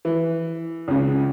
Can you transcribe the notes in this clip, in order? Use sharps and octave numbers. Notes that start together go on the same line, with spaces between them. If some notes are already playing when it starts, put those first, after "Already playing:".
E3
C#2 C#3